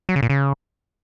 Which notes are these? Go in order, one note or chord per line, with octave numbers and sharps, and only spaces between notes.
F#3
C#3
A#2
C#3